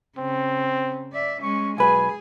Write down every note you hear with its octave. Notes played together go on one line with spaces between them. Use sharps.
C#3 C4
D5 E5
G#3 C#4 C#6
B1 G#4 B4 G#5